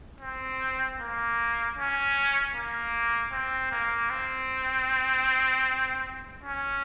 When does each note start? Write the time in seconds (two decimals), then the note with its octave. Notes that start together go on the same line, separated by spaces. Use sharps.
0.20 C4
0.99 A#3
1.77 C#4
2.55 A#3
3.32 C4
3.72 A#3
4.10 C4
6.44 C#4